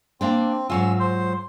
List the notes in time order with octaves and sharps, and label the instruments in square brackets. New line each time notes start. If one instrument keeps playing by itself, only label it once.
[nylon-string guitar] A#3 D4 G5 [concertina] C4
[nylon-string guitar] G#2 F#3 F4 [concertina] C#4 E6
[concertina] C5